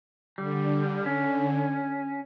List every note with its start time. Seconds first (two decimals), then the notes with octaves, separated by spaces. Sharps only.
0.38 D3 G3
1.06 C#4